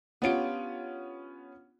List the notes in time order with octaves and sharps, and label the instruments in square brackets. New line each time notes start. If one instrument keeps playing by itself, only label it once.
[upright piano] B3 C#4 D7 [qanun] D4 F4 G4